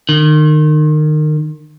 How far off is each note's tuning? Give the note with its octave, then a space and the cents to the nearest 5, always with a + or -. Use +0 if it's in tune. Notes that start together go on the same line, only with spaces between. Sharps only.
D#3 -30